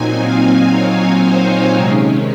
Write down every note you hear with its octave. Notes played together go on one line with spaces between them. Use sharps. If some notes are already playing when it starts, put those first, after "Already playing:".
Already playing: A#2 F#3 C4 D#4 G#5
F5
C#5
C5
C3 D#3 G#3 C#4